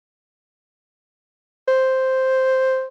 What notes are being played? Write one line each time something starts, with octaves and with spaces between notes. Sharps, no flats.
C5